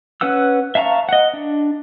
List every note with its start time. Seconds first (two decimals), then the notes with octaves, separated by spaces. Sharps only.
0.21 C#4 B4 F#5 E6
0.75 E5 F5 A5 A#5 C#6
1.09 D#5 F#5
1.33 D4